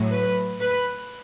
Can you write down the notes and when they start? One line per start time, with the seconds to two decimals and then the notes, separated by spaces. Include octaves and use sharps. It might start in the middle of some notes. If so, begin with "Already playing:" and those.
Already playing: A2 F#3
0.11 B4
0.60 B4